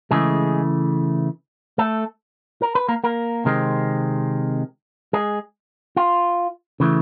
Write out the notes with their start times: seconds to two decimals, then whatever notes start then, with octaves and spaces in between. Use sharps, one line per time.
0.11 C#3 E3 G#3 A3 G#4
1.78 A3 A4
2.62 A#4
2.75 B4
2.89 A#3 A#4
3.04 A#3 A#4
3.45 C3 D#3 G#3 C4
5.13 G#3 G#4
5.97 F4
6.80 C#3 E3 A3